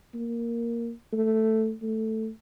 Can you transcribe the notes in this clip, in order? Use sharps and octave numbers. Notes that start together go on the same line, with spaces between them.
A#3
A3
A3